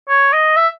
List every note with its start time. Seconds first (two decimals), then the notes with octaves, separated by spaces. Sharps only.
0.09 C#5
0.33 D#5
0.56 E5